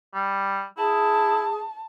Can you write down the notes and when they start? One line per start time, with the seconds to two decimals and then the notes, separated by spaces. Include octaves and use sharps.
0.14 G3
0.78 E4 G#4 A5